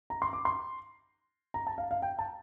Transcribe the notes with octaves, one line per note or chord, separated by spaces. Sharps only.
A#5
C6
D6
C6
A#5
A5
F5
F5
G5
A5